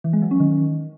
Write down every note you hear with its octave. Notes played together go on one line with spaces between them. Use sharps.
E3
G#3
F#3
C#4
D#3